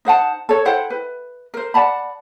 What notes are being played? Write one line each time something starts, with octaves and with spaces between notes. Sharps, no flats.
D#4 C5 F#5 A5
A4 C#5
E4 C5 F#5 G5
B4
A#4 C5
D5 F#5 A5 B5